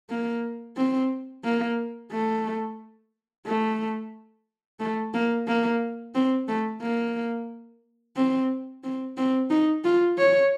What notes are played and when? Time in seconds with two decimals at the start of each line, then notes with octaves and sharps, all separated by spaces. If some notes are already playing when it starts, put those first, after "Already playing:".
0.10 A#3
0.77 C4
1.45 A#3
2.12 A3
3.46 A3
4.80 A3
5.14 A#3
5.48 A#3
6.14 C4
6.48 A3
6.82 A#3
8.16 C4
8.84 C4
9.17 C4
9.50 D#4
9.84 F4
10.18 C#5